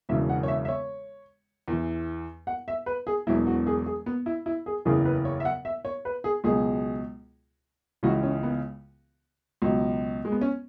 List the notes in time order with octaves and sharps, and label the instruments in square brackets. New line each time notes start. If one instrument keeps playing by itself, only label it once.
[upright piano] E1 E2 C#3 F#3 E5
F#5
C#5
E5
E5
C#5
E2 E3
F#5
E5
B4
G#4
E1 E2 B2 F#3 E4
F#4
G#4
G#4
B3
E4
E4
G#4
F#1 E2 C#3 E3 G#4
B4
C#5
E5
F#5
E5
C#5
B4
G#4
C#2 B2 F#3 G#4
C#2 C#3 E3 F#4
C#4
B3
C#2 B2 F#3
G#3
B3
C#4